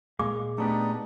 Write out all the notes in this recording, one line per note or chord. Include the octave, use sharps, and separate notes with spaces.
A#2 G#3 F5 D6
A3 B3 D4 D#4 G4